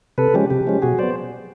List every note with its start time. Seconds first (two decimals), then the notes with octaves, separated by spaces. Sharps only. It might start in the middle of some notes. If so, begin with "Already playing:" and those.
0.18 C3 A4 B4
0.34 F3 G#3 C#4 G4
0.50 C3 G4
0.67 F3 G#3 C#4
0.82 B2 F#4 G#4
0.98 F#3 B3 C5 D5